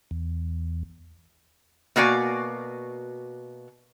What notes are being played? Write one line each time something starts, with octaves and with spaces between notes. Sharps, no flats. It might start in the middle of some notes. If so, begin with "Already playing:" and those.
E2
B2 A#3 F#4 D5 G#5